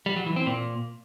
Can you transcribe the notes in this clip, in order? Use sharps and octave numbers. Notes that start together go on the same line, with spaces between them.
G3
F#3
E3
C4
A#2